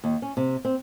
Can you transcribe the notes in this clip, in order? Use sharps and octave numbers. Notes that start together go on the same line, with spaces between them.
D#2
C#4
C3
C4